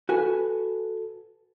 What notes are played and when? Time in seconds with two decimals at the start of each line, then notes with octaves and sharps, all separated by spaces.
0.09 F#4 A4 B4 G#5